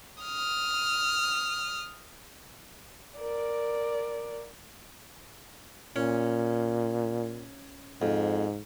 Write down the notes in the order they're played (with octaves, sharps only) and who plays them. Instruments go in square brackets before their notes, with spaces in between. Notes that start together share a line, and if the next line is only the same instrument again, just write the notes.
[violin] D#6 F6
[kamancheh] A#4 D5
[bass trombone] A#2 [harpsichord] C#4
[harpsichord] F2 [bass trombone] G#2